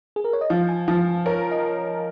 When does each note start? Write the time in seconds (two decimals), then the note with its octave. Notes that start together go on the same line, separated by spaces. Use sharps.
0.16 G#4
0.24 A#4
0.33 C#5
0.41 D#5
0.50 F3 F5
0.69 G#5
0.88 F3 F5
1.26 A#4 C#5
1.51 D#5